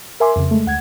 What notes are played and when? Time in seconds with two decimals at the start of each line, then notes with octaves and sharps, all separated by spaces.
0.20 A#4 E5 G#5 C6 D6
0.36 F2 C#3
0.51 G#3 A3
0.66 D2 F#5 G#6